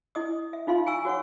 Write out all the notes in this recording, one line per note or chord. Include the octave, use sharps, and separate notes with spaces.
E4 D#5 D#6
E5
D#4 F4 F5 C6
G5 G#5 A#5 C#6 E6
F#4 C#5 F#5 C#6